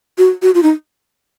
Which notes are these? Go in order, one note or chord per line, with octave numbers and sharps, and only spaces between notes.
F#4
F#4
F4
D#4